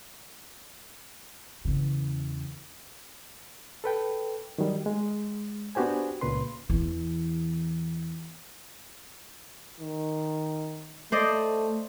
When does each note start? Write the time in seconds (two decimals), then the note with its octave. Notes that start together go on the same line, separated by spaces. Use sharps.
1.65 E2 C#3
3.84 A4 B4 G5
4.58 D#3 F#3 G3
4.86 G#3
5.75 B3 D4 F#4 G4 C5 G#5
6.21 C#2 A#2 C#3 B4 C6
6.69 E2 E3
9.80 D#3
11.12 A3 C5 D5 D#5